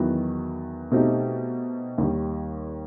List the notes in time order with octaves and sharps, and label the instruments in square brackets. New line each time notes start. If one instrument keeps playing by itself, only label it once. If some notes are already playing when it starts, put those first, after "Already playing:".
Already playing: [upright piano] E2 D#3 F#3 B3 F#4
B2 A3 C4 D#4 G4
D#2 D#3 G3